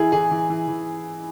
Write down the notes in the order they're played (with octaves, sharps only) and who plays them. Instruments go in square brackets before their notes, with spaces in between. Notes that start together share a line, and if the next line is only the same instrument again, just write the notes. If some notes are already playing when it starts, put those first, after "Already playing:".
Already playing: [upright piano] E3 E4 [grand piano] G#4
[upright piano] E3 [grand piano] G#4
[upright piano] E3
E3
E3